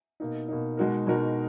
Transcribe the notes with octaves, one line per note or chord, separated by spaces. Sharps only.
B2 A#3 D#4
B2 A#3 D#4
B2 G#3 D#4 F#4 A#4
B2 G#3 D#4 F#4 A#4